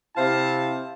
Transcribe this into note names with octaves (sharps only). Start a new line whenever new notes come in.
C3 E4 C5 F5 A5